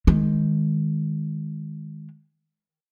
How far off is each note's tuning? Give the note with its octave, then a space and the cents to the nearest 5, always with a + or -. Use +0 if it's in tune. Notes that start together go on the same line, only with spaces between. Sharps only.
D#3 +5 G#3 +0